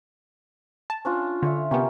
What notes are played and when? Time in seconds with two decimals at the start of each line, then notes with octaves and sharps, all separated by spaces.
0.90 A5
1.05 C#4 D4 F4
1.42 D3 F4 C#5 E5
1.71 C3 A#3 B3 C#4 G4